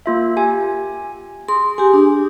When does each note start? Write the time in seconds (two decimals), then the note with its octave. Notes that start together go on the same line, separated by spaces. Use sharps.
0.06 A#3 F4 E5
0.37 G4 G#5
1.48 G#4 C6
1.78 G4 G#4 G#5
1.93 D4